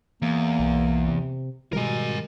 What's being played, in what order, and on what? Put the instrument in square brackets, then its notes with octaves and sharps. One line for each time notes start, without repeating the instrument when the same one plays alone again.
[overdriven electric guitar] E2 [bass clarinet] A#3
[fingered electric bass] B1
C3
[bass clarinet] B2 [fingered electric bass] D#3 G3 G#3 [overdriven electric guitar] A#4 G#5